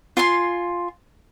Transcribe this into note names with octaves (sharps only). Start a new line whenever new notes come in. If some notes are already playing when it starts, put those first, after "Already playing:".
F4 G#5 C6